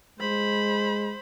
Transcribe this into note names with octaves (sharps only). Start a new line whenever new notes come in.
G#3 C5 B5